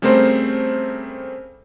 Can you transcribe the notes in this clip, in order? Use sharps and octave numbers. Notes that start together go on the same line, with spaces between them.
C#3 G3 A3 C4 A#4 C5